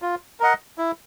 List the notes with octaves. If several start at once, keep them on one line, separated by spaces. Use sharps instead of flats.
F4
A#4 D#5 F#5
E4